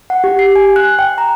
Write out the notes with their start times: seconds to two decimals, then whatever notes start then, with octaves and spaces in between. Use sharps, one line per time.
0.10 F#5
0.24 G4
0.39 C7
0.56 G#5
0.76 F#6
0.99 G5
1.18 A#5